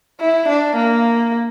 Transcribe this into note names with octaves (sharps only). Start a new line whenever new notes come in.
E4
D4
A#3